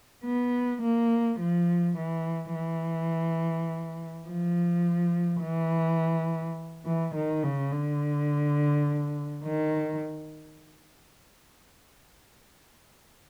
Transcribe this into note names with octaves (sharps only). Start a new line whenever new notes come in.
B3
A#3
F3
E3
E3
F3
E3
E3
D#3
C#3
D3
D#3